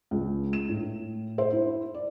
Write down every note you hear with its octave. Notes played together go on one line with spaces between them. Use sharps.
C#2
E7
A2
C5
E4
D5